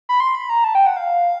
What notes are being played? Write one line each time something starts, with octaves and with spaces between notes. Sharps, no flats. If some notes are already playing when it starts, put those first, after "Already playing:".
B5
C6
B5
A#5
A5
G5
F#5
F5